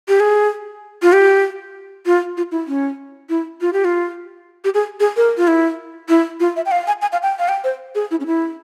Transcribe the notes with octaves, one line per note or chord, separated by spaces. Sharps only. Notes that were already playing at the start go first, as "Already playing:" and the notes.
G4
G#4
F4
G4
F4
F4
E4
C#4
E4
F4
G4
F4
G4
G#4
G#4
A#4
F4
E4
E4
F4
E5
G5
F5
G#5
G#5
F5
G5
F5
G5
C5
G#4
E4
C#4
E4